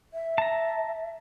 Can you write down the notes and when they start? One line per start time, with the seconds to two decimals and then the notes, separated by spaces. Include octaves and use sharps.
0.13 E5
0.38 A5 A#5